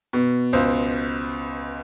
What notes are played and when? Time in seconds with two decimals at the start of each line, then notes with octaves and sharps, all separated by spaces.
0.13 B2
0.53 C#2 C5